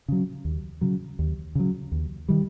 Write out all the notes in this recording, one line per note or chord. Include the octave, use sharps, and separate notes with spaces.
C#3 F#3
D#2
C#3 F#3
D#2
C#3 F#3
D#2
D#3 G3